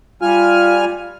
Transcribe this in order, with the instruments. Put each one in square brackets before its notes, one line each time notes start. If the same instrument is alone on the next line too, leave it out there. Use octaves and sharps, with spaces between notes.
[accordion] G3 G#5 F6 [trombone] F4